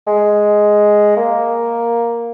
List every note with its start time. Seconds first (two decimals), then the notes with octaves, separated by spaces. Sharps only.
0.07 G#3
1.17 A#3